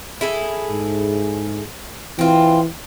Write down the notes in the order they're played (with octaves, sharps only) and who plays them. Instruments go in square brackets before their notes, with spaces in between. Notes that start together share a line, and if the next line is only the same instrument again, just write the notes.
[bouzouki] E4 G#4 A4
[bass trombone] G#2
[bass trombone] E3 [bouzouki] C4 F4